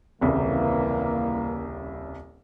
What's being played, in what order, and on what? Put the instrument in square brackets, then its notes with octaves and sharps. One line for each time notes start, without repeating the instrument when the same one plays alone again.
[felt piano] D#1 C2 C#3 [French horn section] E3 A#3